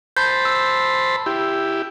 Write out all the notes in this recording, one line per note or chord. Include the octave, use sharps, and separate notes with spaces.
C5 A5 B5 G6
E6
E4 G4